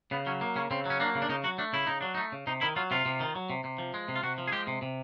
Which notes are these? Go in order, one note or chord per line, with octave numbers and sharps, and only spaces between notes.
C#3 B3
F#3 C#4
A#3
C#3 C#4
C#3 C4
F#3 C#4
A#3 D4
C#3
D4
C#3 D#4
F#3 F#4
A3 D4
C#3 E4
C#3 D#4
F#3 D4
A3 D#4
C#3
C3 D#4
D#3 E4
F#3 F4
C3 F4
C3
D#3
F#3
C3
C3
F3
G#3
C3
F4
C3 F#4
F3
G#4
G#3 G4
C3
C3